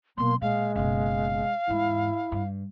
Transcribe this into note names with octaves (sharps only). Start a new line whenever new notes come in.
B2 F#3 A#3 C6
A#2 G#3 F5
F#1 B2 F5
E2 G#2 E4
G2